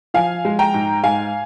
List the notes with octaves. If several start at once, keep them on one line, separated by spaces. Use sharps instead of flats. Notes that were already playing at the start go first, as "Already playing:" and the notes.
F3 F5 G#5
G#3
G5 A#5
G#2
G#2 F5 G#5